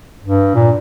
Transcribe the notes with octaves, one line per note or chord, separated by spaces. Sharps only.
G2
A#2